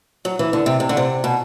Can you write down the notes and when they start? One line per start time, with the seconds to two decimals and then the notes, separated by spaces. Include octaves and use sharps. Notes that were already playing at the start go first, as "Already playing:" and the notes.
0.25 F#3
0.39 E3
0.53 D3
0.66 C3
0.80 C3
0.89 D3
0.97 C3
1.24 B2